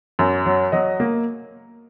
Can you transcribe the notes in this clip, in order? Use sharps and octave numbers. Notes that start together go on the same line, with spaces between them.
F#2
F#3
F#3 D#5
A#3